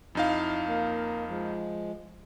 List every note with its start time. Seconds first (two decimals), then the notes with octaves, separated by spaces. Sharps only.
0.15 F2 D#4 E4 F5
0.68 A#3
1.29 F3 G#3